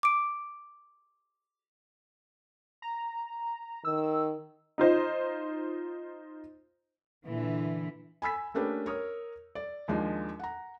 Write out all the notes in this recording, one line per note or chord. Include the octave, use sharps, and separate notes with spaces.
D6 D7
A#5
D#3 E6
D#4 F4 C5 D#5
A#2 D3 E3
G#5 B5 E6 B6
A3 A#3 C#4 D4 G4 B4
A#4 C#5 D#6
D5
D#2 F3 G#3 D4 D#4
F#5 A#5